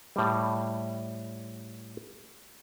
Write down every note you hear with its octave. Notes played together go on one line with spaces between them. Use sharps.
A2 G3